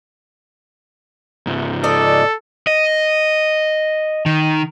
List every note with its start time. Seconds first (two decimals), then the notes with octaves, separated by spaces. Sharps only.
1.47 C#2 G#2
1.84 A4 D5 D#5
2.67 D#5
4.26 D#3